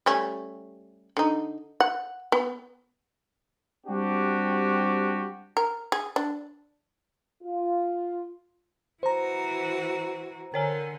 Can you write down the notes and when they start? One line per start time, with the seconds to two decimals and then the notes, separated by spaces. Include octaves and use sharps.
0.06 G3 A3 C#4
1.17 D3 D#4
1.80 F#5
2.32 B3
3.87 G3 C4 D4 F#4 G4
5.57 A#4
5.92 G#4
6.16 D4
7.43 F4
9.03 E3 F#4 C5 A#5
10.54 D3 A#4 C#5 G#5